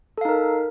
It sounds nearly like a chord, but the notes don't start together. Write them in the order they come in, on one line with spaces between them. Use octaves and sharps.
A4 F5 D#4 A#4